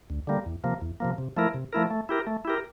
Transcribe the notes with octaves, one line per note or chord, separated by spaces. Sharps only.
D2
D3 G3 A#3
E2
C3 F3 A#3
E2
C3 F3 A#3
C3
F3 A3 E4 A#4
C3
F3 A3 E4 A#4
A3
E4 G4 A#4
A3
E4 G4 A#4